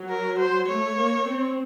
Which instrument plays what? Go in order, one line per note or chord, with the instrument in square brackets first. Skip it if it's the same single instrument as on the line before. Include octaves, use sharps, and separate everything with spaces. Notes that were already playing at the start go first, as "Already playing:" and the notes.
Already playing: [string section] F#3
[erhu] A#4
C5
[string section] A3 [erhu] C#5
[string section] A#3
C4